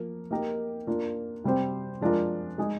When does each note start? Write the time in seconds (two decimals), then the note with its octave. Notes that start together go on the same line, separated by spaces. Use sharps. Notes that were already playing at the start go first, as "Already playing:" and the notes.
Already playing: F3 A#3 A#4
0.31 A#3 D#4 G4 A#4
0.87 A#3 D4 F4
1.44 C3 G3 C4 G4 C5
2.01 F3 G#3 D4 F4 A#4
2.58 G#3 D#4 G#4